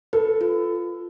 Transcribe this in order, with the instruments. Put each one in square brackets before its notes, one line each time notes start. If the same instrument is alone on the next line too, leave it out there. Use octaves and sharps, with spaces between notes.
[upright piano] A4 [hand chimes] B4
[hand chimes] F4